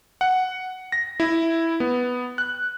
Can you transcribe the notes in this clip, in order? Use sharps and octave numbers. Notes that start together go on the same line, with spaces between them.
F#5
A#6
E4
B3
F#6